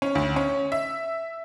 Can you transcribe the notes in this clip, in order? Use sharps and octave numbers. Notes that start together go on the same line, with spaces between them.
C#4
D2
C#4
E5